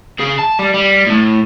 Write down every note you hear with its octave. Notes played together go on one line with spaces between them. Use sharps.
C#3 G#4
A5
G3
G3
A2 A3